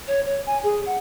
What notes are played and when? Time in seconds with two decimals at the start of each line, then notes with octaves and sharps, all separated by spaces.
0.08 C#5
0.26 C#5
0.46 G#5
0.63 G#4
0.86 F#5